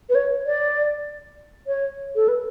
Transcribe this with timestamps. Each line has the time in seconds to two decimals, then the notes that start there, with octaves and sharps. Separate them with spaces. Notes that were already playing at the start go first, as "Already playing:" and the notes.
0.09 B4
0.15 C#5
0.46 D5
1.67 C#5
2.16 A4
2.28 B4